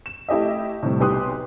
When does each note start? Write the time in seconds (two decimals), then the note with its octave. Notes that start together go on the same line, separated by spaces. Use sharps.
0.06 E7
0.28 A3 E4 G4 D#5 E5
0.83 A2 C3 G3
1.00 B1 B3 G4 C6 D#6 F#6